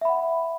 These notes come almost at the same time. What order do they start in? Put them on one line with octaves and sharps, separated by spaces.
E5 B5 F#5